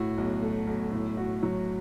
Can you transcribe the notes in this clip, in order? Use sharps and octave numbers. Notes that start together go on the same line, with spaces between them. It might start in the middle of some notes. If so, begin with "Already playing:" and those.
Already playing: A2 F#4
B1
A3
B1
A2
F#4
F#3